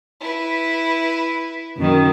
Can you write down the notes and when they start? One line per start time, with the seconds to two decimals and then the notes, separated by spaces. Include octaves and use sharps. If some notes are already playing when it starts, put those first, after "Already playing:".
0.20 E4 B4
1.77 F#2 D#3